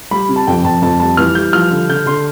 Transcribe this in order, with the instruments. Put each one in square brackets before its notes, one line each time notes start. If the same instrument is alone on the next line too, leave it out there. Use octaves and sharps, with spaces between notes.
[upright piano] G3 B5
C3
A5
F2 G5
F2 A5
F2 A5
G3 A5
E3 F6
G3 G6
F3 F6
D3
D3 G6
D3 C6